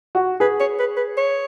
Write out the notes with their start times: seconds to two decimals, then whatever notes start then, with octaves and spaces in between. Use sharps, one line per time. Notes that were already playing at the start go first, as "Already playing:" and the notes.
0.15 F#4
0.40 G#4 B4
0.60 C#5
0.79 B4
0.97 B4
1.17 C#5